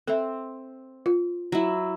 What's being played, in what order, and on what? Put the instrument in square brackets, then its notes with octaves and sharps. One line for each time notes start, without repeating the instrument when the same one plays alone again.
[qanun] C4 [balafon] A4 E5
[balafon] F4
[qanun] F#3 E4